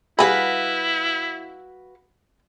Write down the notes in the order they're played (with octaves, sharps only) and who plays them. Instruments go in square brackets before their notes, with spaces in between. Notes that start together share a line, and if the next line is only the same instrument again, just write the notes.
[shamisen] G3 G#4 B5 [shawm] E4 [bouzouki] F#4 B4 F5